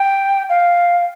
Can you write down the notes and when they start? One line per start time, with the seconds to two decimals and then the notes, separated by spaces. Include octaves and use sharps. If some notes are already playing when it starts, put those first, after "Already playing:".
Already playing: G5
0.49 F5